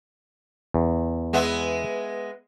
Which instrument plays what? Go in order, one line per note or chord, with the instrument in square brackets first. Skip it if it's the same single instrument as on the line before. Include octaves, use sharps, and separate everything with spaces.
[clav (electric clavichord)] E2
[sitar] G#3 B3 E5